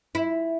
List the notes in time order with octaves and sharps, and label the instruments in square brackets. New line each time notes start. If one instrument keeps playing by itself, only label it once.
[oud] E4